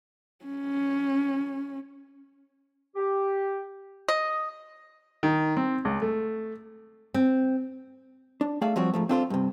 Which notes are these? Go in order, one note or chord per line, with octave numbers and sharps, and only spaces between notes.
C#4
G4
D#5
D#3
C4
C#2
A3
C4
D4
A3 G#4 D5 E5 F5
F3 G3 C4 F#4 C#5
G#2 F3 A3
C4 D4 F4 A4 B4 C5
G2 C3